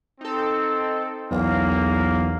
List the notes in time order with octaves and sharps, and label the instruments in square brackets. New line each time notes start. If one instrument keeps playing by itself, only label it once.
[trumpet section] C4 [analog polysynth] D#4 A4
[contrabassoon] B1 [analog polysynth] E2 [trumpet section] A#3 F5